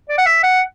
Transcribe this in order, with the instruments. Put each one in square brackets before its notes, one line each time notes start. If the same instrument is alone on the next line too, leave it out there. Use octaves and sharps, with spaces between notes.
[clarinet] D5
F#5
E5
F#5